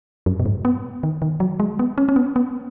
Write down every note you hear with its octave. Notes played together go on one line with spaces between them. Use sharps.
F#2
B2
G#2
B3
D#3
D#3
F#3
G#3
B3
C#4
C#4
B3
B3